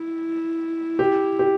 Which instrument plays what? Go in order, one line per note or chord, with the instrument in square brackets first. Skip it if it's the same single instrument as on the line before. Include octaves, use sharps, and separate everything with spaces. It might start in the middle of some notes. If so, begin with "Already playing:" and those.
Already playing: [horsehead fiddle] E4
[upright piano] G4
G4